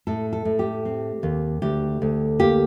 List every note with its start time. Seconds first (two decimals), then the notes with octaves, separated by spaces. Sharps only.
0.07 A2 A4
0.33 A4
0.45 A2
0.59 G4
0.85 C4
1.23 D#2
1.62 D2 G4
2.02 D2
2.39 A#3 G4